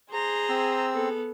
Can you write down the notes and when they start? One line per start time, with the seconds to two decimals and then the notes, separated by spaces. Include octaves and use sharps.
0.11 G#4 C5 A#5
0.49 C4 E6
0.94 B3 A4